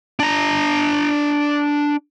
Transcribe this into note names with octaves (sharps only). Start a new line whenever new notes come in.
D4 A#5